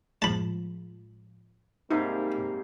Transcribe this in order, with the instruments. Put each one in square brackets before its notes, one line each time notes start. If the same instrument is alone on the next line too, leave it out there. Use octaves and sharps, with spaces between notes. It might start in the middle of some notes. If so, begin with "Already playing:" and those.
[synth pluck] A2 F3 G#3 [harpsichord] A5 B5
[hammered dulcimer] G#2 C3 G3 [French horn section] A#3 [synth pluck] D#4